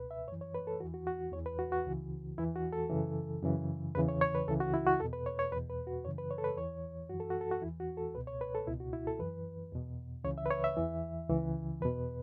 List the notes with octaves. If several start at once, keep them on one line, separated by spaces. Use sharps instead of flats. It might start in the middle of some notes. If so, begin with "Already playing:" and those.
Already playing: C#2 B2 B4
E5
F#2 E3 C#5
C#5
B4
A4
E2 E3 F#4
F#4
F#4
E2 E3 C#5
B4
F#4
F#4
C#2 C#3 E3
E2 E3 E4
F#4
A4
F#2 C#3 E3
F#2 C#3 E3
E2 C#3 E3 B4
C#5
C#5
B4
C#2 C#3 E3 A4
F#4
E4
F#4
E2 B2 A4
B4
C#5
C#5
E2 B2 B4
B4
F#4
F#2 C#3 E3 C#5
B4
C#5
A4
B4
E2 E3 C#5
F#2 E3 F#4
A4
F#4
A4
F#4
E2 E3 E4
F#4
A4
C#2 B2 B4
C#5
B4
A4
C#2 B2 E4
F#4
E4
A4
F#2 E3 B4
E2 B2
C#2 C#3 E3 C#5
E5
B4
C#5
E5
E2 E3
C#2 C#3 E3
E2 B2 B4